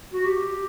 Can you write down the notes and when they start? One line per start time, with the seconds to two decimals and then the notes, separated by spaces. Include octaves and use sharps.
0.13 F#4
0.26 G4